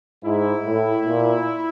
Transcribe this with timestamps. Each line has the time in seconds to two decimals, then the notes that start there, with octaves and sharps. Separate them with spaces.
0.24 G#2 E4
0.66 A2
1.06 A#2